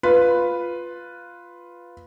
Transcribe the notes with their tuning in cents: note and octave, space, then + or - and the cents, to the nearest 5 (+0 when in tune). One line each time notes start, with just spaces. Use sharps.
F4 +0 B4 +0